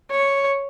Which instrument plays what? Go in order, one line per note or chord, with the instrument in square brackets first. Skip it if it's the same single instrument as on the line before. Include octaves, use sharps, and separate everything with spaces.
[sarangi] C#5